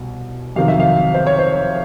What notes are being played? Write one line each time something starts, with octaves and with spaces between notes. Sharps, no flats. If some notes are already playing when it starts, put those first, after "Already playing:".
Already playing: C2 B2
F2 C3 D#3 F#3 F5
E5
F5
C5
C#5
C5